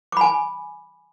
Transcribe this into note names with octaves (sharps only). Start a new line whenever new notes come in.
G#5 B5 D6